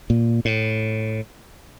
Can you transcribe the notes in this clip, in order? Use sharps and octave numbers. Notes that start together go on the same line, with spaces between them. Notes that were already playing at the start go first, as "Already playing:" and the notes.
A#2
A2